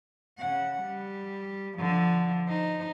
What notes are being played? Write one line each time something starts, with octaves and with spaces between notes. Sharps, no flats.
C#3 F#5
G3
D3 F3
D#4 C5